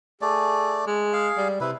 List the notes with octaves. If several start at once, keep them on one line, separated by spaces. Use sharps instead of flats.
A3 G#4 D5
G#3
G#4 F5
G3
C3 E4 B4